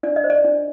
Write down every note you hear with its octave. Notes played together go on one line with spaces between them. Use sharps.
D4 D5
D#5
C5
D5
D4